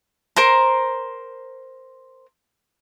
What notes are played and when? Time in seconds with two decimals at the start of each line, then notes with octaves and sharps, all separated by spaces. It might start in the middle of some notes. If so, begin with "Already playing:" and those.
0.36 A#4 C5 A#5